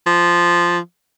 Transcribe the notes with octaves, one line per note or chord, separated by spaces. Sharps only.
F3